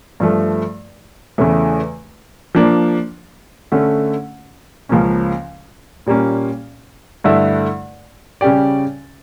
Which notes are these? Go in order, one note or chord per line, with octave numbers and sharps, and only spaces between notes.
G2 F3 A3
E2 C#3 E3 A3
F3 A#3 D4
D3 A3 C#4
C#2 C#3 F3 A#3 C#4
A#2 G3 A#3 C#4
G2 D3 A3 E4
C#3 G3 C#4 G4 D5